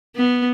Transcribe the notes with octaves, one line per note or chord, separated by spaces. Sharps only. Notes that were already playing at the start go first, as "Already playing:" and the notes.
B3